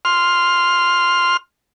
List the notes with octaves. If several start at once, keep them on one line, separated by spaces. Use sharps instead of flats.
C6 F6